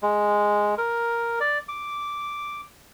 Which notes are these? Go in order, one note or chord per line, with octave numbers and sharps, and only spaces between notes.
G#3
A#4
D5
D6